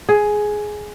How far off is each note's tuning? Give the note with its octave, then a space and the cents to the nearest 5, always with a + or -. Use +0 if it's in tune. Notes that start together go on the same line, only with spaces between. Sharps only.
G#4 +10